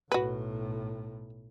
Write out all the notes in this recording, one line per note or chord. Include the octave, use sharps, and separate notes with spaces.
B1 A2 F#4 B4